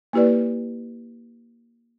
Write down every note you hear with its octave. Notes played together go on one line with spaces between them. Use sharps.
A#3 E4 G4 B4 D5